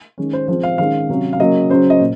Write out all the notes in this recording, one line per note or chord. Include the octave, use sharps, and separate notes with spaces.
D#3 G#3 C#4
C5
F3 G#3 C4 C5
F5
D#3 G#3 C#4 F5
C3 F#3 C#4
F5
C#3 F#3 A#3 C#4 D#5
C#3 F#3 C#4 C5
D#5
A#2